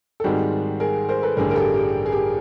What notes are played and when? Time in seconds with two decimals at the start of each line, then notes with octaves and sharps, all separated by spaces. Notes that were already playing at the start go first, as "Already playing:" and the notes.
0.20 A4
0.24 G#2 D#3 G3 C4 F#4 G#4
0.80 G#4 A#4
1.09 A#4 C5
1.23 A4 B4
1.37 A1 G2 D3 G3 G#4 A#4
1.50 A#4
1.55 G4 A4
1.74 G4
2.06 G#4
2.12 G4